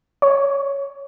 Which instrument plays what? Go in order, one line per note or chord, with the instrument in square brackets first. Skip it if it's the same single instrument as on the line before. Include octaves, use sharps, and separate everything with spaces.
[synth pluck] C#5